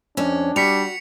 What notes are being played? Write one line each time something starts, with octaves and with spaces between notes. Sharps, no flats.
F2 C#4 D4
G3 F#4 B6 C#7 F7